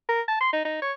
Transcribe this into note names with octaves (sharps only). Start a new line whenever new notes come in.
A#4
A5
C6
D#4
D#4
C#5